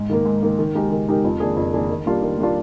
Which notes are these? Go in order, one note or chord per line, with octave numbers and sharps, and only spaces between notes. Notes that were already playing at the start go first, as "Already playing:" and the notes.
Already playing: G#2
D#3 A#3
G#2
D#3 A#3
D#3
G#3 D#4 G4 A#4
D#3
G#3 D#4 G4 A#4
F2
D#3 A#3 D4 G#4
F2
D#3 A#3 D4 G#4
D#3
G3 A#3 D4 F4
D#3
G3 A#3 D4 F4